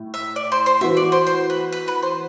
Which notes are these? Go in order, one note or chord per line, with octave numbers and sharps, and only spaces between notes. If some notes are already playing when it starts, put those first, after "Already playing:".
Already playing: A2
E5
D5
C5
C5
E3 B3 F#4 E5
D5
C5
C5
B4
B4
B4
C5